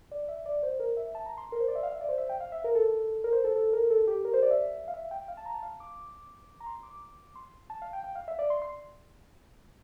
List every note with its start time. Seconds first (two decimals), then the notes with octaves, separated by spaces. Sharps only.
0.11 D5
0.28 E5
0.46 D5
0.63 C5
0.80 A#4
0.97 E5
1.15 A5
1.26 A#5
1.38 C6
1.52 A#4
1.60 C5
1.68 D5
1.75 E5
1.83 F5
1.92 E5
2.01 D5
2.09 C5
2.18 E5
2.29 G5
2.40 F5
2.52 E5
2.64 A#4
2.75 A4
3.24 A#4
3.32 C5
3.44 A4
3.56 A4
3.73 A#4
3.90 A4
4.07 G4
4.25 A#4
4.33 C5
4.42 D5
4.51 E5
4.88 F5
4.94 E5
5.11 G5
5.28 F5
5.37 A5
5.46 A#5
5.54 A5
5.63 F5
5.80 D6
6.60 A#5
6.66 C6
6.83 D6
7.35 C6
7.70 A5
7.82 F5
7.93 G5
8.04 G5
8.15 F5
8.28 E5
8.39 D5
8.50 C6
8.62 C6